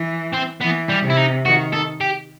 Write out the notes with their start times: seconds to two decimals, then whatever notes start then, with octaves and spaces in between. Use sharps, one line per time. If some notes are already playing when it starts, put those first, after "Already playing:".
Already playing: E3
0.33 C4
0.61 E3 B3
0.89 G3
1.03 C3
1.10 E4
1.17 D#4
1.45 D#3 F#4
1.73 A4
2.01 G4